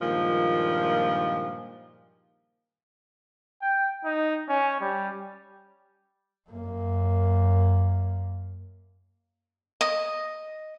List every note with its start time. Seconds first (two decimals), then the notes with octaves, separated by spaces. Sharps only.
0.01 G2 A#2 D#3 F3 G#3 A#3
3.62 G5
4.05 D#4
4.49 C#4
4.81 G3
6.49 F#2 A#3
9.81 D#5